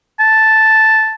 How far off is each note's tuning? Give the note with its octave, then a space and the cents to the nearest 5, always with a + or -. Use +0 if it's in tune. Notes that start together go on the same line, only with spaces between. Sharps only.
A5 -5